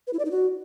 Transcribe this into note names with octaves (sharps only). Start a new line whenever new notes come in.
B4
E4
D5
D#4
F#4